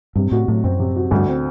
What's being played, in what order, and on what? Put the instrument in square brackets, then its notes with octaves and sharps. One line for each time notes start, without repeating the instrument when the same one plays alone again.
[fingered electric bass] G2 [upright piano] C3
[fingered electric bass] A2 [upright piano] F#4
[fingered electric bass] A2 [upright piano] F#3
[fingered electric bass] F#2 [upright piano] C4
[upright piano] C3
F#4
[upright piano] D2 [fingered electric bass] G2
[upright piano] C4